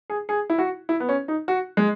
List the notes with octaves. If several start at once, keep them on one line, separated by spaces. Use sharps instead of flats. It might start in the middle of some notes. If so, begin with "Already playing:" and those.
G#4
G#4
E4
F#4
E4
B3
C#4
D#4
F#4
G#3